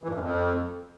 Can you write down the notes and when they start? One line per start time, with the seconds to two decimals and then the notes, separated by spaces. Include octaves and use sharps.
0.04 E3
0.09 G2
0.14 F#2
0.20 F2